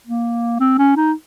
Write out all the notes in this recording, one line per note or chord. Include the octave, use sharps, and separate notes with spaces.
A#3
C4
C#4
D#4